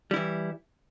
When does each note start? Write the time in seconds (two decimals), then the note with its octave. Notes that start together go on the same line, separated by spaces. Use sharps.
0.11 G3
0.14 E4
0.16 E3